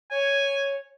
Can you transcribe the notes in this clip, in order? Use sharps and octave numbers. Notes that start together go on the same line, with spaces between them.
C#5 G#5